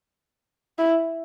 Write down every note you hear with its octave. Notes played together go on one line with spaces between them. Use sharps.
E4